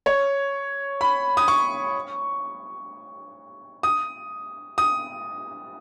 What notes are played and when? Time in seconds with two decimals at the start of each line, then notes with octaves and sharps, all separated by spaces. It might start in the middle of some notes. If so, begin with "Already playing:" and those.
0.06 C#5
1.01 B5
1.37 D#6
1.48 C#6
3.83 D#6
4.78 D#6